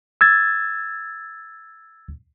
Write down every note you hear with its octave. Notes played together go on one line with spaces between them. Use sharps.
E6 G#6 A6